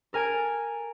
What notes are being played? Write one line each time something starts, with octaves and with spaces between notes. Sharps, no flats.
A4 A#4 G#5 G#6 D7